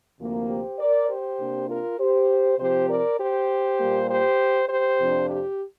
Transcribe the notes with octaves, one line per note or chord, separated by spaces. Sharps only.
D2 C3 F3 A#3
G4 C5
A#4 D5
G4 C5
C3 A#3 D4
F4 A#4
G4 C5
C3 F3 C4 G4 C5
A#4 D5
G4 C5
A#2 G3 A#3
G4 C5
G4 C5
F2 C3 F3 D4
G4